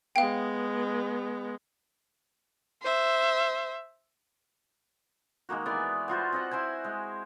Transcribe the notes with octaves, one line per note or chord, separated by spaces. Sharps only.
G#3 B3 F5 G5
C5 E5
D#3 G#3 A#3 F#4
E3 B3 D5 G#5
B3 F4 F#4 C5
C4 D#5 F#5
E4 C5 D#5 G#5
G#3